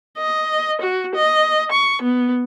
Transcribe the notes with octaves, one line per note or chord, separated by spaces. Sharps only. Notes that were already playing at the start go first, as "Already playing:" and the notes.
D#5
F#4
D#5
C#6
B3